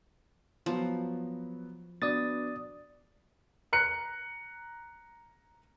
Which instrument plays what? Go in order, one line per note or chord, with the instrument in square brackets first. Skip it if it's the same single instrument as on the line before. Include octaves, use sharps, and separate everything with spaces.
[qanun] F3 [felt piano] F#3 B3 F#4
[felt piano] B3 D4 F#4 [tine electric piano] D5 D#6 A6
[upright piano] A#5 F#6 C#7